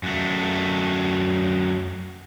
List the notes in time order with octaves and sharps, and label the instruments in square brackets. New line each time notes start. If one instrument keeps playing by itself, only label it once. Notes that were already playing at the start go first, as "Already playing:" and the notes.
[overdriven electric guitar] F#2 A3